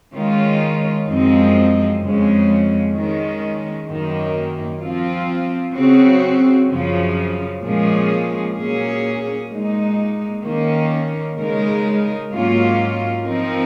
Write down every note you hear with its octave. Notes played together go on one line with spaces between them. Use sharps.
D#3 G#3 C#4 F4
F#2 F3 G#3 C4 D#4
F2 C#3 F3 G#3 C#4
D#3 G#3 C#4
F#2 D#3 A#3
F3 C4 F4
C#3 F#3 C4 F#4
F#2 C#3 F3
A#2 F3 G#3 C#4 G#4
A#2 F#3 A#3 C#4 G#4
A#2 G#3 D#4
D#3 A#3 C#4
C#3 G#3 D#4 A#4
G#2 F#3 A#3 C#4 F4
F3 C4 D#4 A#4